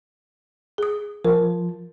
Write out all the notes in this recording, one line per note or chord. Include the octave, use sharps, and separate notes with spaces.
G#4 D#6
F3 A#4